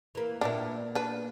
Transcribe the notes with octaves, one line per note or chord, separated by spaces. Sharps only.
E3 A#3
A#2 B3 D4 E4
D4 B4